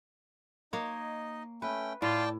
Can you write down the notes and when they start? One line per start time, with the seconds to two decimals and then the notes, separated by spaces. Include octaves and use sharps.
0.73 A#3 D#4 C#5 D#5
1.62 A3 C#4 B4 G5
2.02 A2 F4 D5 G5 A5